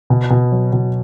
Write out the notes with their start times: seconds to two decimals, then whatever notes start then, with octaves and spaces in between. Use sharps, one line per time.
0.10 B2
0.30 B2
0.52 F#3
0.73 B2